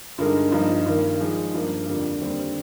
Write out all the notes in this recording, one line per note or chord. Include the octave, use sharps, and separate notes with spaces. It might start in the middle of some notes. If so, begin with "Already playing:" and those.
G2 D3 G#3 D#4 A#4
G2 F3 A#3 D#4 A#4
G2 D#3 A#3
F3 G#3 D#4
G2 F3 A#3
F2 D3 G3 A#3
D#2 D3 G3 C4